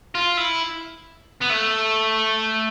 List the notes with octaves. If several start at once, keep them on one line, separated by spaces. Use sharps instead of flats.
F4
E4
B3
A3